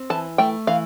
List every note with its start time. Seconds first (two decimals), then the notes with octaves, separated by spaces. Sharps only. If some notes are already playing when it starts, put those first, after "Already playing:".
Already playing: C4
0.10 E3 A5
0.38 A3 G5
0.67 E3 F5